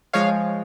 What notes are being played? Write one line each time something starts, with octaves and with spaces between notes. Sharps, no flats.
F3 G#3 C#5 F5